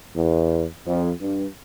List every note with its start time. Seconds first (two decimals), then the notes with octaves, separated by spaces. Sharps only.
0.15 E2
0.86 F2
1.21 G2